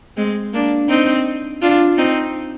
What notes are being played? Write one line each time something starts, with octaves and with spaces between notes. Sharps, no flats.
G#3 C4
A#3 D4
C4 D#4
D4 F4
C4 D#4